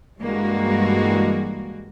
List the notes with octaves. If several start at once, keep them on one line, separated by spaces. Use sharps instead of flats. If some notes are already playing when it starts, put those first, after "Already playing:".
G2 E3 G3 G#3 A#3 F#4